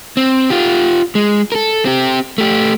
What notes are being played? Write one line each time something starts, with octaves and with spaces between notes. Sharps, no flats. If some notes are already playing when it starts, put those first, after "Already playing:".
C4
F4 G4
G#3
A4 A#4
C4 G4
A3 G4